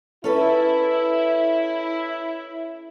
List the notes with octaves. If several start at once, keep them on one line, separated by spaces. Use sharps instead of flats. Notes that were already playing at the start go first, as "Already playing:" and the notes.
C#4 E4 A4 B4